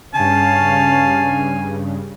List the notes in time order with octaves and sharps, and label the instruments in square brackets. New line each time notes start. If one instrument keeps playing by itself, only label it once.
[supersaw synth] G2 C#3 [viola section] C#4 F5 [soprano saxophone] G#5 [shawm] A5